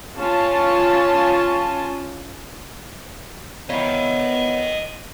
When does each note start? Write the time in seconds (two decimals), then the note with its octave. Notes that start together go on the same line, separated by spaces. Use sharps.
0.17 C#4 F4 A5
3.70 B3 E4 C#5 D#5 F5 G5